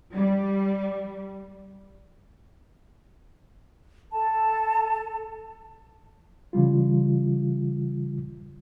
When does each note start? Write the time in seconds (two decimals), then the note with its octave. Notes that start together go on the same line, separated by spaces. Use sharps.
0.15 G3
4.12 A4 A5
6.53 C#3 E3 G3 F4